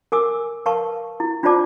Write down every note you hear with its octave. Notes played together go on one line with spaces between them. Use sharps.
A#4 G#5 D6 E6
A#4 B4 F5 A5 C#6
E4
D4 F4 C5 D5 A5 D6